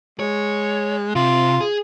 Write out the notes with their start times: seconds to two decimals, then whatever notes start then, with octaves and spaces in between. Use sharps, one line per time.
0.19 G#3 C#5
1.15 C3 F4
1.61 G#4